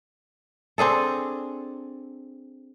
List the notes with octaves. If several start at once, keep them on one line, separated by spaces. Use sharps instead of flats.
C4 D4 G#4 A4